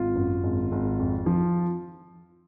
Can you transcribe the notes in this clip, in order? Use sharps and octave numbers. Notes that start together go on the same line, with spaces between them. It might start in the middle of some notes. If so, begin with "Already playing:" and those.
Already playing: G#1 F4
F#2
G#1
G#1
F2
F3